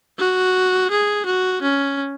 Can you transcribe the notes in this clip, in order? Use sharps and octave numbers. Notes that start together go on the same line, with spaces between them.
F#4
G#4
F#4
C#4